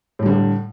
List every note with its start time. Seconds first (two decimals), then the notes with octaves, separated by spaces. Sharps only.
0.19 A2
0.23 G3
0.26 D3